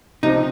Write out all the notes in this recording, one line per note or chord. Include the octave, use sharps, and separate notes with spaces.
C3 F3 C4 D#4